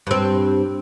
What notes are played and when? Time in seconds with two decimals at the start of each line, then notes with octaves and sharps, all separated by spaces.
0.07 G2 C4